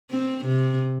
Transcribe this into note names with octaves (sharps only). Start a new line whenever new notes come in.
C4
C3